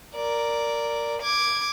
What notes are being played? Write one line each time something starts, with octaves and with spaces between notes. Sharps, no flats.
A#4 D5
D6 G#6